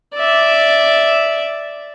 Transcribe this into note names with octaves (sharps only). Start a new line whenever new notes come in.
D5 E5